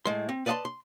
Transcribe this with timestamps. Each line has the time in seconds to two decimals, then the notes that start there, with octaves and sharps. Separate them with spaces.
0.05 A2 G#3 C6
0.29 C4
0.46 B4 D5 D#5 F5 A5 C6
0.65 C6